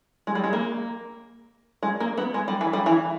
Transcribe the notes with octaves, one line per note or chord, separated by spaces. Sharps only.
G#3
G3
G#3
A#3
G#3
A#3
B3
G#3
G3
E3
G3
E3